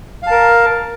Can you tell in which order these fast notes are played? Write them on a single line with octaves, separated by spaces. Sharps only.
F5 A5 A#4